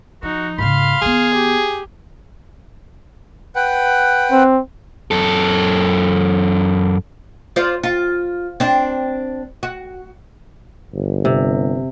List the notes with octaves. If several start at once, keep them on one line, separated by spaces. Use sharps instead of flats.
F3 D#4 F#4
G#2 C#3 F5 B5 C6
D#3 B3 G#4 G#5
G4
B4 F#5 G5
C4
F#2 A4
F4 C5 D5
F4
C4 D4
F#4
G1
C3